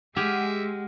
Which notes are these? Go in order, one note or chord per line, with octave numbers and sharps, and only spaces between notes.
G#3 G4 G#4 E5 F#5 G#5 F6